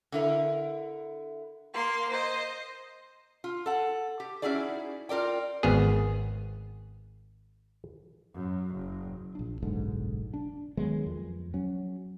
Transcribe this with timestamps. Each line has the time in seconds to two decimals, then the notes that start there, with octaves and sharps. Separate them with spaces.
0.12 D3 E4 A#4
1.74 A#3 C6
2.10 C5 D#5
3.44 F4
3.66 A4 F#5
4.20 G4
4.42 C#4 D#4 E4 F#4 G#4 D5
5.09 F4 A#4 D5 G5
5.63 G#1 B3 G#4
8.34 F#2
8.75 F#1
9.35 A#1 D4
9.62 F#1 B1 G#2 D3
10.34 D4
10.77 D#3 F#3 G#3 B3
11.06 F2
11.54 F#3 C#4